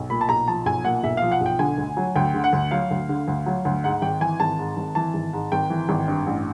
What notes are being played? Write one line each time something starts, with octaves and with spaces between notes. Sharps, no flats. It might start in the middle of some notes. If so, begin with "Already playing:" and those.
Already playing: B1
A#2 B5
A5
B1 A#5
F3 A5
B1 G#5
A#2 F#5
B1 E5
F3 F5
F#5
B1 G5
D3 G#5
D2
F#3
D2 G5
D3
F#5
D2
F#3 F5
D2
D3
D2
F#3
D2
G#2 F#5
G#1 G5
E3 G#5
G#1 A5
G#2
G#1
E3 A5
G#1
G#2
G#1 G5
E3
G#1
G2
A1